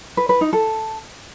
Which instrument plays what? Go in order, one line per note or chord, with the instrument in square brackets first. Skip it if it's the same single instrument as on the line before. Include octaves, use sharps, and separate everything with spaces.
[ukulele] B4
B4
D#4
A4